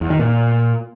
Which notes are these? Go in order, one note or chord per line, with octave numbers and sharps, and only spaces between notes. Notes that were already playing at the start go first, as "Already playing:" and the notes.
E2
D#3
A#2